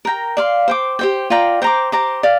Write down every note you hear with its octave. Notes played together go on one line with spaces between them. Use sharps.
A#4 G5 A#5
D5 F5 C6
C5 G5 D6
G4 C5 G5
F4 D5 G5 A#5
C5 G5 A#5 D6
G4 C5 A#5 D6
D5 F5